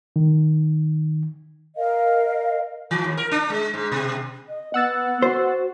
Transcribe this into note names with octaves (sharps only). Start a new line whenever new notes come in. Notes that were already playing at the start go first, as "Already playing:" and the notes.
D#3
A#4 D#5 F5
E3
D#2
A#4
D4
G#3
G#2
B2
D#5
B3 F#5 E6 A6
F#4 C5